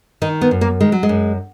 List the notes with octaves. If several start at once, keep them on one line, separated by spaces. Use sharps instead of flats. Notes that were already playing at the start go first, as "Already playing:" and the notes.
D#3 D#4
B3
F#2
A#3
D#3 G#3
F#3
G#3
F#2